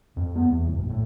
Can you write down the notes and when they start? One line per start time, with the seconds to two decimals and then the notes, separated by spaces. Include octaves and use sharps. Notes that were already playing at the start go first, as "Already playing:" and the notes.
0.16 F2
0.36 B3
0.50 E2
0.66 F#1
0.78 A#1
0.90 A2